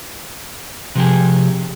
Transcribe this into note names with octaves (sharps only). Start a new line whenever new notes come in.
C3 F3 G4 G#4